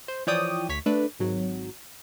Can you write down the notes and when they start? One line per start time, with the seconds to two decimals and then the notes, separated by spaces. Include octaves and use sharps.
0.08 C5
0.27 E3 F3 C#5 D5 G5 D#6
0.69 D2 C#5 B6
0.86 A3 D4 B4
1.20 G#1 F#3